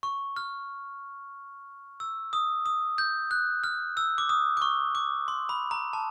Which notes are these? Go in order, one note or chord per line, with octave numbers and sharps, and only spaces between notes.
C#6
F6
E6
D#6
D#6
G6
F#6
F6
E6
D6
D#6
D6
C#6
D6
C6
B5
A#5
A5